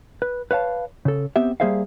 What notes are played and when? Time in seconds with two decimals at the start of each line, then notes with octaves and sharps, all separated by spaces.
0.22 B4
0.51 B4 C#5 F5 A5
1.05 C#3 A4
1.36 B3 C4 G4 E5
1.60 G3 A#3 G#4 C5 E5 F5